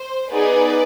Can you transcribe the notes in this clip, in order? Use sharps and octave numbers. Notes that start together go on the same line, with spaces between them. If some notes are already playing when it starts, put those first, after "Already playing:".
Already playing: C5
B3 D#4 G#4 B4 D5